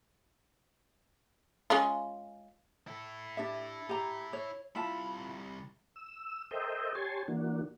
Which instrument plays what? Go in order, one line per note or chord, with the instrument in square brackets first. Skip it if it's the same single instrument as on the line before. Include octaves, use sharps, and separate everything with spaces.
[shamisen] G#3 C#4 F4
[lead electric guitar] E4 A4
[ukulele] D4 G4 E5
G4 A#5
C#5
[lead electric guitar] C2 B5 [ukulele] E4 F4 A5
[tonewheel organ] E6
A4 A#4 C5 D#5 E5 G5
G4 C#5 G#5 A5 C6
E3 A#3 D4 F#4